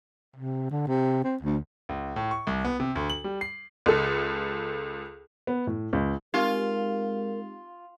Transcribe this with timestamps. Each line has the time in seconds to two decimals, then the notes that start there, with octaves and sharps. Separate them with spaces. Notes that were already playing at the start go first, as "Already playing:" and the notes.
0.36 C3
0.71 D3
0.87 C3
1.24 C4
1.43 D2
1.89 C#2
2.16 A2
2.31 C#6
2.47 C2
2.65 B3
2.80 C3
2.95 D2
3.10 F#7
3.24 G3
3.41 C7
3.86 C#2 A4
5.47 B3
5.67 A2
5.93 C#2
6.34 G#3 C4 D#4 F4 G4 A#4